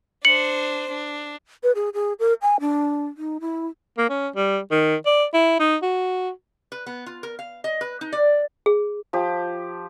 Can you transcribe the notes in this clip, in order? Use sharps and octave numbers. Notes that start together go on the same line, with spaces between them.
D4 C5 C#7 F#7
D4
B4
G#4
G#4
A#4
G#5
D4
D#4
E4
A#3
C#4
G3
D#3
D5
E4
D#4
F#4
B4
B3
F4
A#4
F5
D#5
B4
D#4
D5
G#4
F3 G4